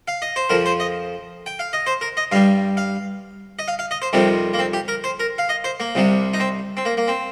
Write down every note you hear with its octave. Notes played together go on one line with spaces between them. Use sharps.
F5
D#5
C5
F2 F3 A#4
C5
D#5
G5
F5
D#5
C5
A#4
D#5
G2 G3 F5
F5
D#5
F5
F5
D#5
C5
F2 C3 D#3 G3 C4
A#3
C4
G4
A#4
C5
A#4
F5
D#5
C5
A#3
C2 C3 G3
D#4
C4
C4
A#3
A#3
C4